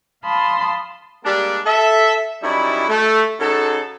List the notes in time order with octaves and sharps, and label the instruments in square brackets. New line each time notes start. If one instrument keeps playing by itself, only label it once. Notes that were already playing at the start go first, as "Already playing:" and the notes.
[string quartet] F5 A5 B5 C6 D#6
[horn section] G3 G#3 A#3 D4
A4 E5
F#2 G3 D#4 E4
A3
C#3 D#4 F#4 A4